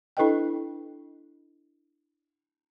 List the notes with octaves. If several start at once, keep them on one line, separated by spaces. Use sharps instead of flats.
D4 E4 A4 B4 D#5 G5